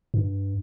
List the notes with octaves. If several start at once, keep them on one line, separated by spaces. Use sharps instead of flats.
G2